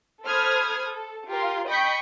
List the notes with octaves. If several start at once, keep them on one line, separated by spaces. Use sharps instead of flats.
A4 C5 B5 D#6 F6 G#6
A4
F4 G4 A#4 C6
D#5 G5 B5 C#6 G6 B6